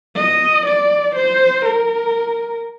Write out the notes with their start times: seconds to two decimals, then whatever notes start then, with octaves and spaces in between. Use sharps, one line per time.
0.16 D#5
0.66 D5
1.16 C5
1.66 A#4